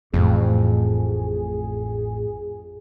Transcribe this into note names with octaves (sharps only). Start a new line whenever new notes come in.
A1 F2 A2 G#4